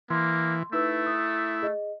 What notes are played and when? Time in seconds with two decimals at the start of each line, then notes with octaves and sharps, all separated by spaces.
0.10 E3 A#3 C6
0.73 A3 D#4 E4 B4 E6
1.06 D#6
1.62 G#4 D#5